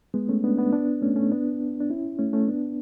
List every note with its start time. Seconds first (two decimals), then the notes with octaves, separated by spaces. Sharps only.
0.14 G#3 B3
0.29 A3 C#4
0.44 B3 D4
0.57 B3 D4
0.73 B3 D4
1.01 A3 C#4
1.16 A3 C#4
1.32 B3 D4
1.80 D4
1.90 C#4 E4
2.19 A3 C#4
2.33 A3 C#4
2.48 B3 D4